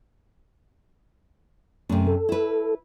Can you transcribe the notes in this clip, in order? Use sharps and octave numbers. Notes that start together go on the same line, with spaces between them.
F#2 C3 A3
A4
E4 B4